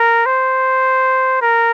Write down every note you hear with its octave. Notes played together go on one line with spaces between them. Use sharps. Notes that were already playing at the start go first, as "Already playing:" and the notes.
Already playing: A#4
C5
A#4